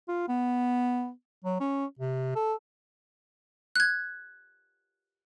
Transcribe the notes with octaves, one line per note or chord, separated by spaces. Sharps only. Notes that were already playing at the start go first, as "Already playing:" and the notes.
F4
B3
F#3
C#4
C3
A4
F#6 G#6